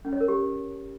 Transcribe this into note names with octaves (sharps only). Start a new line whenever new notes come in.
C#4
C#5
A#4
G4